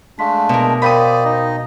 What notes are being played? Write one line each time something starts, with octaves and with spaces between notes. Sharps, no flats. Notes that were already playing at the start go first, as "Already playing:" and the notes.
G#3 A3 D4 F5 C6 B6
B2 A#4
A#4 C5 D5 F5 G5 B5 D#6
D#4 D#5